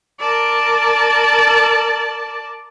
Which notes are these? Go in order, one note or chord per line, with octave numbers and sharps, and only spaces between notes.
A#4 D5 A5